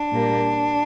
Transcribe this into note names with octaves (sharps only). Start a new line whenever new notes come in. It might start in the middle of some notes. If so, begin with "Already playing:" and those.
Already playing: D4
A#2 G3 A#3